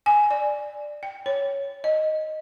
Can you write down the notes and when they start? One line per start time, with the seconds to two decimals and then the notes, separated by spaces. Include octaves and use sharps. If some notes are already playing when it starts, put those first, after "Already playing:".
0.06 G#5
0.31 D5
1.03 G5
1.26 C#5
1.84 D#5